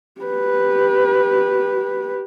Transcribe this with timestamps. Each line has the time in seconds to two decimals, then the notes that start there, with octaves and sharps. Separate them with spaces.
0.21 G4 B4